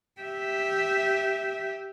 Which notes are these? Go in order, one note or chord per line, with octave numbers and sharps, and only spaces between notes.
G4 E5